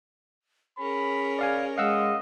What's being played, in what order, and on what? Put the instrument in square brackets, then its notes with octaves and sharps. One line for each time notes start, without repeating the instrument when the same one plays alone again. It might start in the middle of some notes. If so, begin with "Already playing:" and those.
[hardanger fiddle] C#4 A#4 [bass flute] G#4 [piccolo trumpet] B5
[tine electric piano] D5 F5 G#5
[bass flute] G#3 [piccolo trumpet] D#5 [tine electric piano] F5 F#5 E6